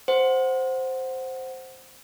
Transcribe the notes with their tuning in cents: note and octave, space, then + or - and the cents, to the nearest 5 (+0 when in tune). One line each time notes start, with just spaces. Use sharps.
C5 +0 F#5 +0